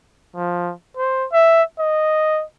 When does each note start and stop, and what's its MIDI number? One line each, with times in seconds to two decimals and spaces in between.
0.36 0.73 53
0.97 1.26 72
1.33 1.63 76
1.79 2.43 75